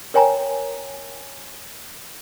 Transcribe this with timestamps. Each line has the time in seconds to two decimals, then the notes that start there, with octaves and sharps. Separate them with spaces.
0.14 A#4 C#5 G5 G#5 A#5